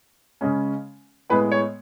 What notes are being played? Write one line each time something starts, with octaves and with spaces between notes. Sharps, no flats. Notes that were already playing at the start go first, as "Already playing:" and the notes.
C#3 G#3 C#4
A2 G#3 B3 B4
C#5